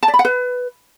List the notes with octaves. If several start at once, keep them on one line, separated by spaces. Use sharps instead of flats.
A5
D5
B5
F#5
B4